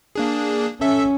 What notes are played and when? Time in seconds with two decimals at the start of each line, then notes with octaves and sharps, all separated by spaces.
0.15 A#3 D4 G#4
0.81 C#4 A4 E5 E6